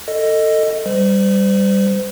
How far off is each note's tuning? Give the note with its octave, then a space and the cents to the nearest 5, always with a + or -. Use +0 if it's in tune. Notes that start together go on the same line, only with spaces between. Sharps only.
A4 +20 D#5 +0
G3 +0 C5 -40